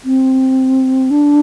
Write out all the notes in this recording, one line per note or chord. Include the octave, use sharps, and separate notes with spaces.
C4
D4